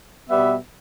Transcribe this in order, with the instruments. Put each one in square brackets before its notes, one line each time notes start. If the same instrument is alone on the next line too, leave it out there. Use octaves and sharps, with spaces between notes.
[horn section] B2 G3 B3 E5